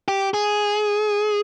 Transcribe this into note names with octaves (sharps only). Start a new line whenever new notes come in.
G4
G#4